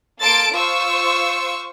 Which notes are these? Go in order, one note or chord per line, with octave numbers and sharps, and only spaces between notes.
A#3 A4 A5 C6 A6 D7
F4 C5 C#6 E6